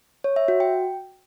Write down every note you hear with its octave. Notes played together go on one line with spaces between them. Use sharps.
C#5
E5
F#4
G5